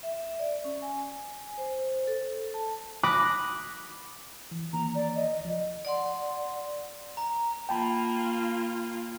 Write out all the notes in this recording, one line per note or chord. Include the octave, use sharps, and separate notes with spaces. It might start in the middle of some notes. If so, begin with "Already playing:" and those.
E5
D5
C#4
G#5
C5
A4
A5
B5 D6 D#6 F#6 A#6 B6
E3
D#3 E3 A#3 A#5
D5
D#5
C#2 F3
D5 F#5 C6
A#5
A#3 F4 G5 A5 B5